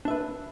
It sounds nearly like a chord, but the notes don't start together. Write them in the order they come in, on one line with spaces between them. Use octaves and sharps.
D4 E5 B4